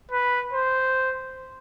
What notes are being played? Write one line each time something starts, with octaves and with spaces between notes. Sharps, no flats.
B4
C5